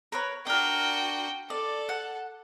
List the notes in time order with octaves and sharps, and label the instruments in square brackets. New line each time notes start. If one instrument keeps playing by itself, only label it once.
[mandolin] A#4 B4 C#5
[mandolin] D4 A#4 [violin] F#4 G5
[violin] A4 [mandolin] D5
[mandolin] F#5